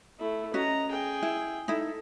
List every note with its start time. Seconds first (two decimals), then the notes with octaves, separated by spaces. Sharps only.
0.19 A3 E4
0.54 C#4 F#4 D#5 A#5
0.90 G#4 G5
1.23 E4
1.68 D#4 E4 A4